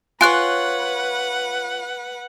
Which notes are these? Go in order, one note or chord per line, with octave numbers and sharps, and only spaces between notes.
F4 B4 C#5 F#5 G#5 F#6